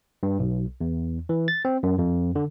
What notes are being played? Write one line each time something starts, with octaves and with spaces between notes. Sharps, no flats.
G2
B1
E2
E3
A6
C4
F#2
F2
D3